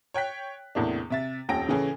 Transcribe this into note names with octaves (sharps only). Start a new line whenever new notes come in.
C#5 G5 F#6 B6
E2 A2 C3 A#3 D4
C3 E5 A6
D#1 F2 C#4 G5 A#6 D7
A2 C#3 E3 A3 C#4 G#4